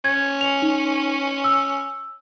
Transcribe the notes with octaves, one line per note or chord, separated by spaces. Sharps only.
C#4 G#6
F7
D#4
E6